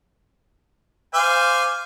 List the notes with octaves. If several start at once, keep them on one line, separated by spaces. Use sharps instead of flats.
C5 F5 G#5 D6